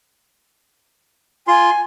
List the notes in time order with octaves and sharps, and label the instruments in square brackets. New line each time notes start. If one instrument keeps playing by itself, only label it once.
[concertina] F4 C6 [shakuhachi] G#5